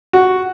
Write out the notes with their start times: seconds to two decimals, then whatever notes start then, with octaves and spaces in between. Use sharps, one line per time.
0.13 F#4